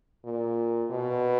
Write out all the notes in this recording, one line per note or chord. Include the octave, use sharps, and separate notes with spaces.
A#2
B2